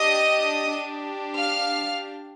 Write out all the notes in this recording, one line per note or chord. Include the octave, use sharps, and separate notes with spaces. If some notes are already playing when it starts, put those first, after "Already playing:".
Already playing: D4 G4 D#5 D#6
D4 G4
F5 F6